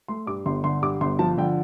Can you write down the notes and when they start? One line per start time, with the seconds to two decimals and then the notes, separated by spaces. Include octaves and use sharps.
0.08 A3 C6
0.27 G2 D6
0.46 G1 C6
0.64 D3 C6
0.82 G2 D6
1.01 G1 C6
1.19 F3 A5
1.38 D3 G5